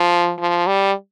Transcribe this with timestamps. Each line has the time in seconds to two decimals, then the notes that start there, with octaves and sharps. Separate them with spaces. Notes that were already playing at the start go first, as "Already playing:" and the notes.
Already playing: F3
0.39 F3
0.67 G3